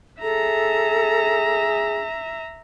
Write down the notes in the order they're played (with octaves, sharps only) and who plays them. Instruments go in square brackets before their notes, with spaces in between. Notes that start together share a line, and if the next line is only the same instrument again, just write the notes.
[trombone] G#4 [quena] A4 [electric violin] E5 A#5